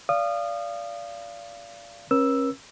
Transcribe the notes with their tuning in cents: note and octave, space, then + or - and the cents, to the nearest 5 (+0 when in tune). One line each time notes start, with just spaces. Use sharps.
D5 -20 F5 -25 D#6 -30
C#4 -30 A#4 +45 E6 +0